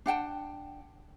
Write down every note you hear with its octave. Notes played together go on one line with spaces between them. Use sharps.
D4 F#5 G5 A5